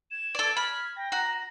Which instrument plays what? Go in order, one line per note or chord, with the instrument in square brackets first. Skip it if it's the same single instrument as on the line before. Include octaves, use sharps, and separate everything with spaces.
[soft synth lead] G#6 [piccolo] E7
[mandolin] A4 D5
[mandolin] B5 [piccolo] F6
[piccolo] G5 [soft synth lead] A#6
[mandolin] F#4 [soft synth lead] A#5 [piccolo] A#6